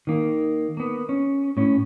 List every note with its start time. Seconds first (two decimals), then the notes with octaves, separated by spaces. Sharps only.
0.07 D#3 A#3
0.77 A#3 B3
1.09 C#4
1.57 A2 C#4